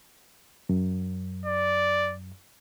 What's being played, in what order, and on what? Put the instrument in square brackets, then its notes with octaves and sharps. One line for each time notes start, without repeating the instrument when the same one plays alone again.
[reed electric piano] F#2
[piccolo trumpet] D5